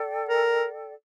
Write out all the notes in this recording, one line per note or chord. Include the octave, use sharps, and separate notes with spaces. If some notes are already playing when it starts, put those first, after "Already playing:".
Already playing: A4 D5 G5
A#4